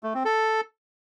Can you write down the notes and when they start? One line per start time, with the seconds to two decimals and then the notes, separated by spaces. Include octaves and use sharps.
0.03 A3
0.14 C4
0.25 A4